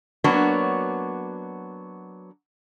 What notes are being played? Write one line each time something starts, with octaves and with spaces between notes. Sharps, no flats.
F#3 A#3 B3 D4 F#4 C#5